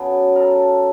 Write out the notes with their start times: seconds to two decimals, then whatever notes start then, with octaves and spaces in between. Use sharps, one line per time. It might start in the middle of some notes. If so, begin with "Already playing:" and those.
Already playing: C#3 F#3 B3 A4
0.36 A4 A#4